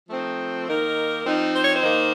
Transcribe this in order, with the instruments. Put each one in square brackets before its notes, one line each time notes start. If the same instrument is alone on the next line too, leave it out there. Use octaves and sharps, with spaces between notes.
[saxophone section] F3 A3 C4 D#4
D#3 A#3 D#4 A#4
F3 C4 D#4
C5
C#5
C5
D#3 A#3 D#4